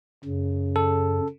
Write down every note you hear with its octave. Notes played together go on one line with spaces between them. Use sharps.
F#2 C#3
A4